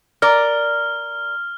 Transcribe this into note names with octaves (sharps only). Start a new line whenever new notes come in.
A#4 D5 F6